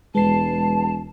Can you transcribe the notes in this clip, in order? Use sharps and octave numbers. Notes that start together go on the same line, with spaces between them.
E1 G#3 B4 A5 C7